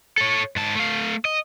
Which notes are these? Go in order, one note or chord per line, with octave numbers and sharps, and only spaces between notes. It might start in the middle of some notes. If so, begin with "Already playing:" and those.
A4 C#5
G#2 A5
A3 F5
D#5